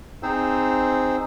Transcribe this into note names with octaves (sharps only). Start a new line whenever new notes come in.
C4 D#4 G#4 C5 E6